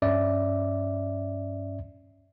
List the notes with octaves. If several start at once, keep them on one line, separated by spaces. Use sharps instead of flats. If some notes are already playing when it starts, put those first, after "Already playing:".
G2 C#4 D5 E5